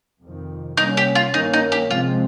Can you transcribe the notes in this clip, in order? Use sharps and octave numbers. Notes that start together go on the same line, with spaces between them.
F2 C3 D#3
C3 G3 A#3 C#4 D#4
G4
F4
G2 D#3 A#3 C#4 D#4
D#4
G4
C3 F3 G#3 C4 F4